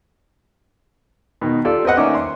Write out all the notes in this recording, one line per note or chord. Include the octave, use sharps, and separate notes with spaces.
B2 D#3
F4 G4 A4 D5
C4 B4 D#5 F#5
D#3 A#3 C#4 D5 E5 D6
C6